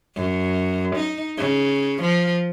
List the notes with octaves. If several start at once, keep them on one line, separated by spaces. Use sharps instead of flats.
F#2
D#4
C#3
F3